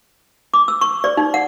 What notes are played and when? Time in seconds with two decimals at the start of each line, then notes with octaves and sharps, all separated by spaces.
0.54 D6
0.68 E6
0.81 C#6
1.04 D5
1.17 D#4
1.34 F#5